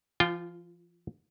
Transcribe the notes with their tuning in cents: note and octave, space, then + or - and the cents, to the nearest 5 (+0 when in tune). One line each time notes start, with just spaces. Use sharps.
F3 -40 F4 +0 G5 +0